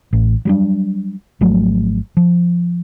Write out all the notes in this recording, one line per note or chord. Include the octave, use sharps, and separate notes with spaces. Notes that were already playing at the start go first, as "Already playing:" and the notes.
A1
F#3 G3 D4
G#1 F3 F#3 A3
F3